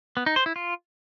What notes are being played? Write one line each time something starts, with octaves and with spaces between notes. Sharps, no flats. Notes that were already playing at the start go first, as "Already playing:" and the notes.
B3
D#4
C5
E4
F4